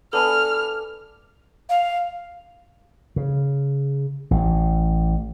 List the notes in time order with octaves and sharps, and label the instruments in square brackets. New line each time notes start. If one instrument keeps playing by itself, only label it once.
[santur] B3 D4 [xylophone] A4 G#5 B5 [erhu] F6
[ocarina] F5
[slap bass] C#3
A1